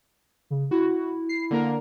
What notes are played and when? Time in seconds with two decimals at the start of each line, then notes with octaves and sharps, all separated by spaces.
0.50 C#3
0.71 E4 F#4
1.29 C7
1.50 D3 A#3 A#4